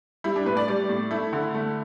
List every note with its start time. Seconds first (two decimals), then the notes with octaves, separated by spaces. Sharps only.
0.24 G3 E4
0.36 D4
0.46 A2 B4
0.57 D5
0.68 G3 D5
0.89 A2
1.11 A3 E4
1.33 D3
1.54 A3